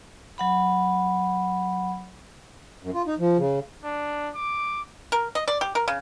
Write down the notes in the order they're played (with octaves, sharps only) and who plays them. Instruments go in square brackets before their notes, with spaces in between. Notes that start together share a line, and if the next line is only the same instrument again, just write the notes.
[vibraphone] F#3 F#5 B5
[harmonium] F#2
F4
D#4
F3
C#3
[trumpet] D4
D6
[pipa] A#4
D#5
D5
G4
A#4
C#3